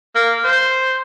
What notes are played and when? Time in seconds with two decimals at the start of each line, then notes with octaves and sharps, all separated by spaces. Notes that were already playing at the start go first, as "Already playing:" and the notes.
0.15 A#3
0.44 C5